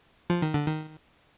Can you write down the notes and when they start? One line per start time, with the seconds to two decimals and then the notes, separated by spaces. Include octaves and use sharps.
0.30 F3
0.42 D#3
0.54 D3
0.67 D#3